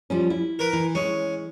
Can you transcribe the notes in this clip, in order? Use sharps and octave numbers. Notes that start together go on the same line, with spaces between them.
F3 G3 C#4
E4
A#4 B4
E3
G#3 C#4